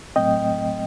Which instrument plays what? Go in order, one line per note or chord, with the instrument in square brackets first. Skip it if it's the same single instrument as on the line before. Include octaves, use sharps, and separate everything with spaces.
[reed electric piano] A2 F#3 A3 C4 D#5 G5